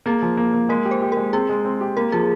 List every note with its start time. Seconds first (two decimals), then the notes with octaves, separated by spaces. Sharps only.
0.06 A#3 G#4
0.22 F3
0.37 A#3
0.54 A#3
0.69 G#3 A#4
0.85 G4
0.91 C5
1.02 G4
1.12 G#3 A#4
1.33 C4 G#4
1.49 G#3
1.65 C4
1.81 G4
1.97 A#3 A#4
2.12 F3 G#4